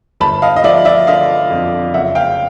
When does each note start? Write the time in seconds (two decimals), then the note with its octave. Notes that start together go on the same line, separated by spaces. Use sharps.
0.20 G1 A5 B5
0.42 D#5 F5
0.56 D#5
0.64 F3 D5 E5
0.85 D5 E5
1.07 D3 D#5 F5
1.50 F2
1.94 F#1 E5 F#5
2.15 F5 G5